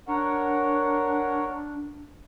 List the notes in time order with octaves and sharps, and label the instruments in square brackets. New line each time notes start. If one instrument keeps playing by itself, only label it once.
[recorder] D4 [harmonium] A#4 C#5 F#5